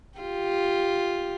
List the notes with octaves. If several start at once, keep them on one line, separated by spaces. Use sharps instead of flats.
F4 G4